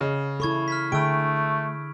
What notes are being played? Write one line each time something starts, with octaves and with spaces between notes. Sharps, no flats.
C#3 D#5
E4 A4 B5 C#6 G#6
F6 G#6 B6
D3 A3 G#4 G5 B5 E6 D7